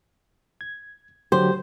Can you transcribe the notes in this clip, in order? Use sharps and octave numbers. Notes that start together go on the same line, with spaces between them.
G#6
D3 F#3 G4 C5